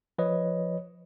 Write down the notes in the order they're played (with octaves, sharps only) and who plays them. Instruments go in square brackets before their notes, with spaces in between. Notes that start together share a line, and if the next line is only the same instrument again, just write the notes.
[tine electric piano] F3 B4 C#5 D#5